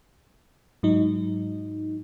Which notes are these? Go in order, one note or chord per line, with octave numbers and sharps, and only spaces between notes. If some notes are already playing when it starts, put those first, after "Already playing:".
G#2 F#3 D#4